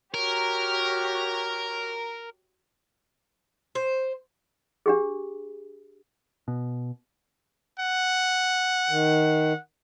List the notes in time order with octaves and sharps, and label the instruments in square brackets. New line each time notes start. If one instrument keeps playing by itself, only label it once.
[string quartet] F#4 G4 C#5 [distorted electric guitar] A#4
[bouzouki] C5
[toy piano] D4 G4 G#4
[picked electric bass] B2
[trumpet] F#5
[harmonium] D#3